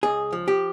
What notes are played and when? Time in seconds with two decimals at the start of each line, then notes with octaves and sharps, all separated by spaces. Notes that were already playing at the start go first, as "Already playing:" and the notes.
0.03 C#2 G#4
0.33 F3
0.48 G4